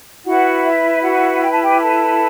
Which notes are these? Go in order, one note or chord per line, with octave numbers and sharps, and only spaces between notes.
E4 F#4 B4 F#5
E5
F#4 F#5
G5
A5
G4 G5
A4 A5